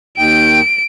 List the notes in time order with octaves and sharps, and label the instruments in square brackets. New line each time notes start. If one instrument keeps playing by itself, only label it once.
[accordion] D#2 D#3 G5 [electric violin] D7